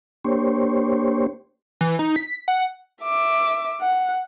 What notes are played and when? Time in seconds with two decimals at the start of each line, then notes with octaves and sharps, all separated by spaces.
0.25 A#3 D4 G4 C5 C#5
1.81 E3
1.99 D#4
2.16 B6
2.48 F#5
3.03 E5 D6
3.82 F#5